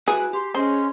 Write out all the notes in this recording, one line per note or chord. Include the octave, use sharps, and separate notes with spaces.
E4 F#4 G#4 B4
G4 C6
C#4 G#4 C5 D#5 C6